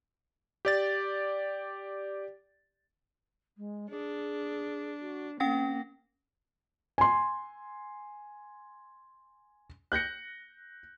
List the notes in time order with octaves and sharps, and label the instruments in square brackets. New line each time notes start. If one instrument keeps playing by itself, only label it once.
[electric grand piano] G4 D5 A6
[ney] G#3
[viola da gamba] D4 [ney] G#4
[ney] F#4
[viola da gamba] A#3 [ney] C4 [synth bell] C#4 G5 A#6
[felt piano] G#5 C6
[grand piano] F#6 G6 A#6 C#7